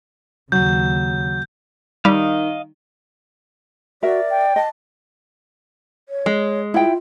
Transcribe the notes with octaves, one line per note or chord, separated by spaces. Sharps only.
D#2 C#3 F#3 G6
D#3 G3 D#5 F5
F#4 A#4 D5 E5
G5
D#5 A5
C#5
G#3
E4 F4 G5